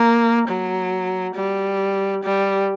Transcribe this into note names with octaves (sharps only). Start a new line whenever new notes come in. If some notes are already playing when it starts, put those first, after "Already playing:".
Already playing: A#3
F#3
G3
G3